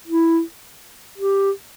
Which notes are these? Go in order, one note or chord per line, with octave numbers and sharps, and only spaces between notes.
E4
G4